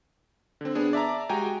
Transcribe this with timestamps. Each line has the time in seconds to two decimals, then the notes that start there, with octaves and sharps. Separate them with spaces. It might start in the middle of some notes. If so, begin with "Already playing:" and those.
0.61 D3 C4
0.75 B3 D4 G#4
0.93 D5 E5 A5 A#5 D6
1.29 G#3 F#4 G4 G5 G#5 A#5